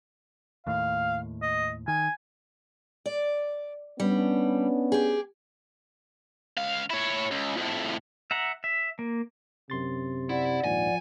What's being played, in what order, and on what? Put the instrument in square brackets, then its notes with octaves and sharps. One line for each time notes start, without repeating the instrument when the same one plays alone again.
[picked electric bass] D#2 A2 [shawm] F5
[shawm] D#5
[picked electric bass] D#3 [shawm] G#5
[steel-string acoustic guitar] D5
[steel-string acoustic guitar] G3 [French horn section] B3 C#4 D4
[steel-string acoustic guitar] G4 G#4
[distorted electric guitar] C#2 F5
E4 C#5
C#2
F2 A2
[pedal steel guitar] E5 F#5 A#5
E5
A#3
[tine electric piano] F#2 C6 A6 [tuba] C3
[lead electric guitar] E4 [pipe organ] D5 F#5
[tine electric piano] A#1 D#2 G#2 [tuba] F3 [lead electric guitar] G#5